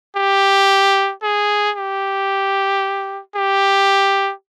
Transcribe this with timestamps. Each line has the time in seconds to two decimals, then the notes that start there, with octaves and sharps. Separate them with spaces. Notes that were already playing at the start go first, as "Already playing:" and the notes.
0.16 G4
1.22 G#4
1.76 G4
3.36 G4